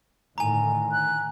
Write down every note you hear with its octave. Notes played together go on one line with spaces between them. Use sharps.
A2 D3 D#3 G#5 A#5
F#6